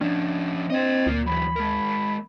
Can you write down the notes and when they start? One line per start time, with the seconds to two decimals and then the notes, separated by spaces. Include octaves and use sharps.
0.01 F3 C#4 D4
0.70 C4 C5 D#5
1.07 D2 A#3 F4
1.26 E3 F#3 B5
1.56 G#3 A#4